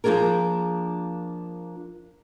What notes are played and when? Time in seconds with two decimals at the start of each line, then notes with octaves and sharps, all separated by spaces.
0.04 F3 A#3 C#4 D4 G#4 A#4